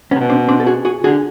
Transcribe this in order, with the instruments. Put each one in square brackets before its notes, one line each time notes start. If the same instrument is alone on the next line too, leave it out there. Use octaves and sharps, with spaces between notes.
[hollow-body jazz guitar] B3 C#4
[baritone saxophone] C3
B2
[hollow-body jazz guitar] C4 D4
C4 D4
A4
F#4 G#4
F#4 G#4
[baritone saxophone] D3 [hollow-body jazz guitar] F#4 G#4